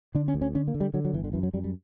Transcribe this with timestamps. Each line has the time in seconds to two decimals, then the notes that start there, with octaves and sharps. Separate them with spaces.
0.15 D3 D4
0.28 C#4
0.34 D2
0.42 C#4
0.54 D3 C#4
0.68 A#3
0.74 D3
0.80 G3
0.94 D3 F#3
1.05 F#3
1.13 G1 E3
1.24 D3
1.33 F#2 E3
1.43 F#3
1.53 F#2 G3
1.64 G3